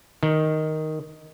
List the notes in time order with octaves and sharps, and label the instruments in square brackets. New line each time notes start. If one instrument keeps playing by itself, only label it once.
[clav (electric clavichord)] D#3